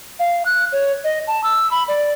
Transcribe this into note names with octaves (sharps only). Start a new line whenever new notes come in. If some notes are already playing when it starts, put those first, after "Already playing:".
F5
F#6
C#5
D#5
A5
E6
B5
D5